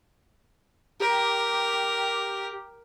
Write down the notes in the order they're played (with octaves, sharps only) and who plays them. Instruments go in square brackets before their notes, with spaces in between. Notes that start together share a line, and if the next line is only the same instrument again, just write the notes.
[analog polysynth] G4 [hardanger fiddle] A#4